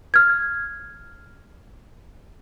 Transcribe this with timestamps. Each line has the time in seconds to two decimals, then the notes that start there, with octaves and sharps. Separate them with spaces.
0.14 F6 G#6